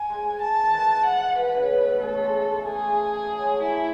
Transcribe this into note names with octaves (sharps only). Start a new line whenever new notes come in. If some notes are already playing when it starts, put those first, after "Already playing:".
Already playing: G#5
G#3
A5
D#3
E3
F#5
B4
C#3
B2
A2
C#3 A4
A3
G#3
A3
G#3
A3 G#4
F#3
G#3
A3
A3 E4